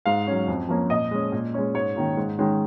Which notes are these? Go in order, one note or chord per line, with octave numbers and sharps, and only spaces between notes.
G#2 F5
F#3 C#4
F2
F3 A#3 C#4
A#2 D#5
G#3 C#4
A#2
G#3 C#4
G#2 C#5
D#3 A#3 C#4
G#2
D#3 G#3 C#4